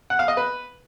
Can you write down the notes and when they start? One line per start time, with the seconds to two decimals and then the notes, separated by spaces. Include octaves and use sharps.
0.10 F#5
0.19 F5
0.28 D#5
0.37 B4